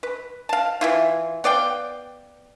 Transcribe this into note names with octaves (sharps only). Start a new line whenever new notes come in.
B4
F5 A5
E3 E4 F4
B3 D5 F5 G5